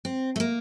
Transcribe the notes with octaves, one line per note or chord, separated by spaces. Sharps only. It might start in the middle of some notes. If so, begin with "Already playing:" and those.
C4
A3
A#3